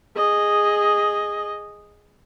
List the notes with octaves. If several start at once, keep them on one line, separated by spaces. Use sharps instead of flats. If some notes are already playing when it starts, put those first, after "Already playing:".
G#4 D#5